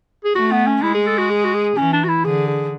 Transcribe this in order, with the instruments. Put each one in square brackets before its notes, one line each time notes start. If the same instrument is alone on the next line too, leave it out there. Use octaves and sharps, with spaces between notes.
[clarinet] G#4
[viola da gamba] A3 [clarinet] F#4
[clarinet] B3
C#4
[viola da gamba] G#3 [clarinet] E4
[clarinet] G#4
A4
F#4
G#4
F#4
G#4
[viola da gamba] E3 [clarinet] C#4
[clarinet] D4
F#4
E4
[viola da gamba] D3 [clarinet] G#4
[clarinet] G#4